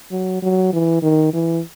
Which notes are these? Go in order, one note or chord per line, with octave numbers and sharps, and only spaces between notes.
F#3
F#3
E3
D#3
E3